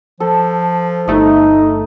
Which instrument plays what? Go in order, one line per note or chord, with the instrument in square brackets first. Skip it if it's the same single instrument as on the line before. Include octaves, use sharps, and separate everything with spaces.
[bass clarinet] F3 [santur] A4
[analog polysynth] G1 A3 [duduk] D#4 [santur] D#5